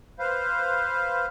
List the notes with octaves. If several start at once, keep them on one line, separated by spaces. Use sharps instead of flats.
B4 C5 F5